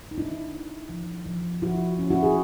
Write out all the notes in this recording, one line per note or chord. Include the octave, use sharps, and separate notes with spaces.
D#4
D4 E4
D4
F3
F3
F3 E4 F#4
C#4
E4 F#4
G#4